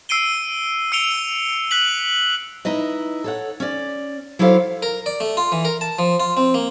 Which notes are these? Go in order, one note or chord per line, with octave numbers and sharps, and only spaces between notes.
E6 C7 D7 D#7 G7
E6 C#7 D7 F7 G7
F#6 B6 F#7
D#4 E4 B4 D#5
A4 C#5 F#5
C#4 D5
F#3 E4 G4 A4 C5 F5
A#4
D5
A3
F4
E3
A#4
A5
F3
F4
C4
A#3